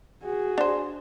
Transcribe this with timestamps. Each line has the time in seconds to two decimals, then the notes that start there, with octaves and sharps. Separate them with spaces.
0.23 F#4 G#4
0.58 D4 C5